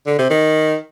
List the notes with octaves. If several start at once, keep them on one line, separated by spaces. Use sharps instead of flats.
D3
C3
D#3